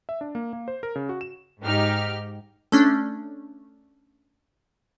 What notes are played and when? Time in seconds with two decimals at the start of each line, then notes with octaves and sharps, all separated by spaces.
0.09 E5
0.21 D4
0.35 A#3
0.53 A#3
0.68 C5
0.83 A#4
0.96 C#3
1.09 F#4
1.21 E7
1.62 G#2 D#4 G4 F6
2.72 A3 C#4 D4